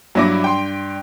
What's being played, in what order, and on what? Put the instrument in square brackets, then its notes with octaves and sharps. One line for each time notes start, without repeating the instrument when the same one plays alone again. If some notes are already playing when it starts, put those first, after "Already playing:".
[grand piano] G2 D4 A#6 [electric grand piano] F#3 E4 D6
[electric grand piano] G5 C6